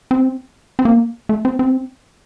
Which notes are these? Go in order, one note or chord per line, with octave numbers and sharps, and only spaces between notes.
C4
C4
A#3
A3
C4
C4